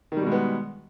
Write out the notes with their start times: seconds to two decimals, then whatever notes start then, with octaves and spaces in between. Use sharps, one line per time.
0.12 D#3
0.17 G3
0.22 B2
0.27 G#3
0.31 B3